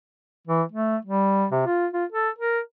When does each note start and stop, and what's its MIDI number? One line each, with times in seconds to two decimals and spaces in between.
0.47 0.62 52
0.72 0.97 57
1.05 1.46 55
1.51 1.62 48
1.66 1.87 65
1.93 2.05 65
2.12 2.29 69
2.39 2.59 70